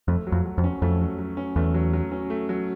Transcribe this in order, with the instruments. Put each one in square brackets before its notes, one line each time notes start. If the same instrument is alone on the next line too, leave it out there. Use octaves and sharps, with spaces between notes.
[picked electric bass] F2 [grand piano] A3
[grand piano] F#3
[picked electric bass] F2
[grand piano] F#3
[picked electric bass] F2
[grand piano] C#4
[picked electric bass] F2 [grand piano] A3
[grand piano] F#3
F#3
C#4
[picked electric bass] E2 [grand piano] A3
[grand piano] F#3
F#3
C#4
A3
F#3